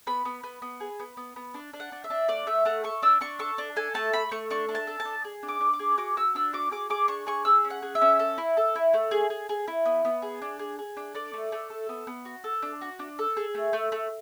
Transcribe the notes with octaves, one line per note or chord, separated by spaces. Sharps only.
B3 B5
B3
B3
B3
G#4
B3
B3
B3
D4
D4
F#5
D4
E5
D4
A3 D5
A3 E5
A3 F#5
A4 C#6
D4 E6
D4 C#6
A4 C#6
D4
A4 G#5
A3 A5
A3 B5
A3 C#6
D4 C#6
D4
A5
A4
A5
D4
G#4
D4
D6
D4
D6
G#4
F#4 D6
F#4 E6
D4 E6
F#4 D6
G#4 D6
G#4 D6
D4 C#6
G#4 C#6
G#4 E6
C#4
F#5
G#4
E5
C#4
A4
E4
A4
E4
A3
G#4
G#4
G#4
E4
B3
B3
G#4
D4
G#4
G#4
D4
A4 D5
A3
A3
A4
B3
B3
F#4
A4
D4
F#4
D4
A4
G#4
A3
A3
A3